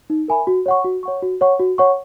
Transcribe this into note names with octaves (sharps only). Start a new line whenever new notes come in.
D#4
A#4 E5 G#5 B5
F#4
C#5 F#5 C#6
F#4
C#5 F#5 C#6
F#4
C#5 F#5 C#6
F#4
C#5 F#5 C#6